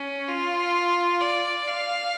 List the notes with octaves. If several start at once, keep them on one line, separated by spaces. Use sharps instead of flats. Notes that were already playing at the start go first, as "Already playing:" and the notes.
Already playing: C#4
F4
D5
F5